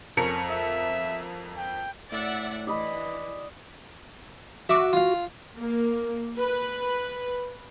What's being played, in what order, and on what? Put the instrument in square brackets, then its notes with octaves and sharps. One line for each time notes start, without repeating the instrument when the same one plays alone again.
[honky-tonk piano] F2 A#4 C#7 [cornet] C#4
[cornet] E5
G5
[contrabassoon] A2 [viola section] D5 E5 F#5
[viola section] E3 [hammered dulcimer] D5 D#5 B5
[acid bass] F#4 [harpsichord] E5 D6
[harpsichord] F4 F5
[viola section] A#3
B4